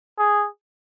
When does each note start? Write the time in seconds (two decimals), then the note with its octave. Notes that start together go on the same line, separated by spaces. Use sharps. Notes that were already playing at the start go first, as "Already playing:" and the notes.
0.19 G#4